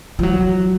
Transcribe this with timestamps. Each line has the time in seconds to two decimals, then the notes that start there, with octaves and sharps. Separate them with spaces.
0.19 F3
0.23 F#3